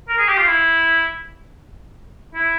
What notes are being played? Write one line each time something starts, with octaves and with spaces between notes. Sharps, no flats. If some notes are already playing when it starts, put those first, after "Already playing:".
A#4
G#4
G4
F4
E4
E4